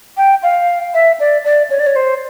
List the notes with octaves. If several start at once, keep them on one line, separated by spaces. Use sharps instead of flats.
G5
F5
E5
D5
D5
C#5
D5
C#5
C5